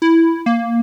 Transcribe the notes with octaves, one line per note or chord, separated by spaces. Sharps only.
E4
A#3